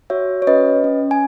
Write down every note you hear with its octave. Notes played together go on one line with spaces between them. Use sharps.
F#4 C#5 E5
C#5
C#4 B4 D#5
C#4
G#5